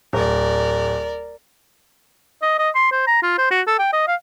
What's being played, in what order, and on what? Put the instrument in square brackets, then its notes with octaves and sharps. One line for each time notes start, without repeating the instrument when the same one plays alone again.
[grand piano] D1 [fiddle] A#4 D5
[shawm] D#5
D#5
C6
C5
A#5
F4
C5
F#4
A4
G5
D#5
F5